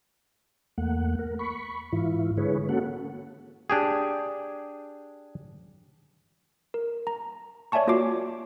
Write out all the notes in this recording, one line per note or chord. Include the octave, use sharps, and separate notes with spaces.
E2 A3 A#3 F#5
A#4
B5 C#6
G#2 E3 E4 F4
D3 G#3 E4 G#4 B4 C#5
A#3 C#4 F#4 A4 F#5
D4 G4 G#4
A#4
A#5
C#5 D5 E5 G#5 A5 C#6
A#3 F4 F#4 C#5 D6 C7